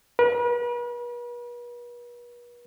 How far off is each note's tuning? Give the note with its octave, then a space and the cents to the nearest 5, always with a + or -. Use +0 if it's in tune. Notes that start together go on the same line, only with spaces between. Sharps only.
B4 -40